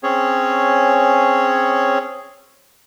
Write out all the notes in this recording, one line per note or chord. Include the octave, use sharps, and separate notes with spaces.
C4 C#4 G#4 C#5